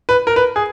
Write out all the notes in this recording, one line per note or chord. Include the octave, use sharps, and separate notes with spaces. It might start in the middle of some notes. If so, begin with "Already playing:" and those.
B4
A#4
B4
G#4